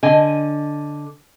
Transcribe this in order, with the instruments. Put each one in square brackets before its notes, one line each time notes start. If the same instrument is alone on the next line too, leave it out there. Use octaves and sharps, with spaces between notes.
[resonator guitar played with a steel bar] D3 D#5 G#5